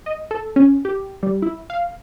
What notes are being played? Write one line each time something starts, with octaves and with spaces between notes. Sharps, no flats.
D#5
A4
C#4
G4
G3
E4
F5